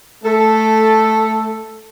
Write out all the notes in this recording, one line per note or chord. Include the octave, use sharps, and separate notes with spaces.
A3 A4